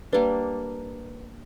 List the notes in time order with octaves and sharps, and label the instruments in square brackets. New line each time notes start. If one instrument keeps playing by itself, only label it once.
[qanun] G3 A#3 D4 [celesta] B4